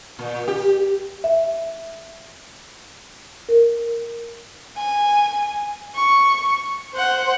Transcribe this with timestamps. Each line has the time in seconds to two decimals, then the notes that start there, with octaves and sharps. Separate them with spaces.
0.19 A#2
0.48 G4
1.24 E5
3.49 A#4
4.76 G#5
5.95 C#6
6.94 C5 F#5